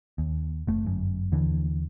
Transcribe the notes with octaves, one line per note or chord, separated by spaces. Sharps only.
D#2
F#1 A3
G1 F#2
D#2 D3 E3